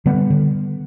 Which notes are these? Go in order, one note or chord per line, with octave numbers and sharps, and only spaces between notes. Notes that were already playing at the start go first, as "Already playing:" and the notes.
D3 G3 B3
D3